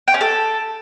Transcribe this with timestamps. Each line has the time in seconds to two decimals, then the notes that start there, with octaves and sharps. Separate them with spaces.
0.08 G5
0.14 C#4
0.21 A4